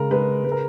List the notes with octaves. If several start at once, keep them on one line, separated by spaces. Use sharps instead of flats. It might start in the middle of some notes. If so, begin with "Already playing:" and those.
Already playing: C#3 G#3 A#4
G#3 B4
G#3 B4
A#4